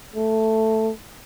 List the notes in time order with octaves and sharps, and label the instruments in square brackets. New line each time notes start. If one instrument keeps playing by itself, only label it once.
[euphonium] A3